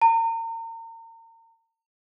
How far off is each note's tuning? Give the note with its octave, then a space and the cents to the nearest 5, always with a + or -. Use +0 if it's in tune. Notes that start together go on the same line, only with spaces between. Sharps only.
A#5 -35